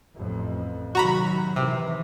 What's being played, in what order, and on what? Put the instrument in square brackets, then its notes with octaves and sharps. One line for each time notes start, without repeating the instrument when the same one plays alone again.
[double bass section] A1 F2
[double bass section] C3 D#3 F#3 [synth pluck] F#4 A#5 B5
[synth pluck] C3 [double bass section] D#3 E3